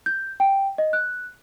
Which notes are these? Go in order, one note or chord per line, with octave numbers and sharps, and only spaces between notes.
G6
G5
D#5
F#6